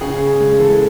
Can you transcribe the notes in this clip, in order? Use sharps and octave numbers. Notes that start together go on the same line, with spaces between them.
C#3 G#4
C#3
G#3
E3 A4